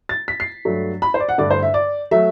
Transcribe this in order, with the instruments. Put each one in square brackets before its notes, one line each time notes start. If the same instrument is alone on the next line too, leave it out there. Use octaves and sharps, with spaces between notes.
[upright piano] A6
B6
C7
G2 F#3 A3
B5
C5
D5
F#5
G2 D3 A3 D5
C5
E5
D5
F#3 A3 E5